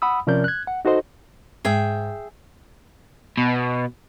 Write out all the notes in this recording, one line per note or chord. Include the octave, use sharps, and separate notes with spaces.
F#5 B5 D#6 E6
C3 F3 C#4 A#4 D5 G6
F#6 G#6
F#5
D#4 F#4 A4 C5 D#5
G#2 G#4 E5 G5
B2